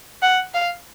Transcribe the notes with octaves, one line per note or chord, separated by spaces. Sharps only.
F#5
F5